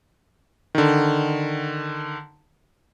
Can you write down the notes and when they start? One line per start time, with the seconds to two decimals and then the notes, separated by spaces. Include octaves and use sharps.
0.75 D3 D#3